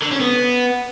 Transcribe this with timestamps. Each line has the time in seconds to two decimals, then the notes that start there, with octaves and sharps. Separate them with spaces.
0.02 D3
0.11 C#4
0.20 B3